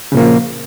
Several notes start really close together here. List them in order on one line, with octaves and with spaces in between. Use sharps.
C#3 A#2 A#3 F3